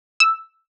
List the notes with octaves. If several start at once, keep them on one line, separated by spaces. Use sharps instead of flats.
E6